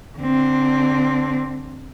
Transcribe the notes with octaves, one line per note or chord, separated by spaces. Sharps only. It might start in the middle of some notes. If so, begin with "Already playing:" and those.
D3 C4